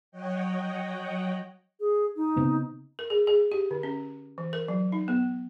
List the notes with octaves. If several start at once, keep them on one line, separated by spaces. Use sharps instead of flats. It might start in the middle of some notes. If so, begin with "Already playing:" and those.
F#3 C#5 D#5 F#5 G5
G#4
D#4
C#3 B3 C4
A#4
G#4
G#4
G4
D3
C#4
E3
A#4
F#3
D#4
B3